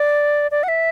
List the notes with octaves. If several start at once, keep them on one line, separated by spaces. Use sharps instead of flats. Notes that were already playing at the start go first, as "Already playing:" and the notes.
Already playing: D5
D5
F#5
E5